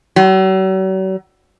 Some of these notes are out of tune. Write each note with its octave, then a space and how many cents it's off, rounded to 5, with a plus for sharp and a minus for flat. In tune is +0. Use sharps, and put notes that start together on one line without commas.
F#3 +45